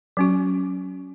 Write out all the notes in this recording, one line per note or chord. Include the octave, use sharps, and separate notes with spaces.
F#3 C#4 F#4